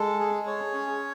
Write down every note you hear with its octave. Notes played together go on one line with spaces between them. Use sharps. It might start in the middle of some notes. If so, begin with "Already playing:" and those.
Already playing: G#3 A4
G#4
C#5
C#4